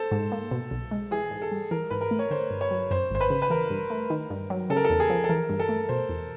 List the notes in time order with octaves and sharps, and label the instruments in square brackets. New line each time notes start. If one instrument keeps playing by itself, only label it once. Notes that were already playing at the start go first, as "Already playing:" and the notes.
Already playing: [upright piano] A4 C5
[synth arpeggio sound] G#2
A#3
B2
B1
G#3
[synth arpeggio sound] E3 [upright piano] G#4
[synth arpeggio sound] G#2
[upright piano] A4
[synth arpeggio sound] G3
[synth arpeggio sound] E3 [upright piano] A#4
[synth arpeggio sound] G#2 [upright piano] B4
[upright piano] A#4
[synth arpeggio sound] A3
[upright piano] C#5
[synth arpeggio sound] D3 [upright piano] C5
[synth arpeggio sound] G2
[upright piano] C#5
[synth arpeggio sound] F#3
[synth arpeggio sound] F#2 [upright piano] C5
[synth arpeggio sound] G#1 [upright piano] C5
[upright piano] B4
[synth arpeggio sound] C#3
[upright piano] B4
[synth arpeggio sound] E3 [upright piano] A#4
[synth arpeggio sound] G2
A3
D#3
G2
F#3
[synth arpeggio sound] C#3 [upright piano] A4
[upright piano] A#4
A4
[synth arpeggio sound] E2
[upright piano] G#4
[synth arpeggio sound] F3
[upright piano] A4
[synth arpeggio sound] E3 [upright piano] A#4
[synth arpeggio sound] G2
[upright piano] A4
[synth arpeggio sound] A3
[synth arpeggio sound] B2 [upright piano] C5
[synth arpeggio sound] E2